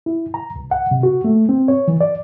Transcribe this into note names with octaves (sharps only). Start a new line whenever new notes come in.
E4
A#5
C2
F#5
C3
F#4
A3
C4
C#5
E3
D5